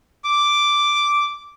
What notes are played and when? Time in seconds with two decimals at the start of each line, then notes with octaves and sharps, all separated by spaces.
0.24 D6